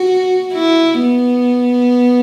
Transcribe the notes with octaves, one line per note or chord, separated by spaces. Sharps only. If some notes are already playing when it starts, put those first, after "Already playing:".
Already playing: F#4
E4
B3